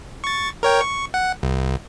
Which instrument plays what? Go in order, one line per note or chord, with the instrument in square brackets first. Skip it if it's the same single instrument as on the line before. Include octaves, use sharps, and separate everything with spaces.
[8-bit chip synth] C#6 A6
A#4 C#5 G5
C#6
F#5
C2